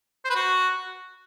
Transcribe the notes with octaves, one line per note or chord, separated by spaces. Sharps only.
C5
B4
F#4